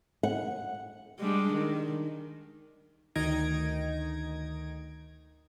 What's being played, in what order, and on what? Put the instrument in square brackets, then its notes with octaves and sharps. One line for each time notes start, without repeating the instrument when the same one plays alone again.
[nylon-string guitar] F#5
[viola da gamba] G3 G#3 D4
D#3
[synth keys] D2 D#3 D#4 G#6 A#6 D7